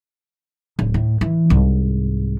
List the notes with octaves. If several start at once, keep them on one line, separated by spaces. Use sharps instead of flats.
D1
A2
E3
C2 G#2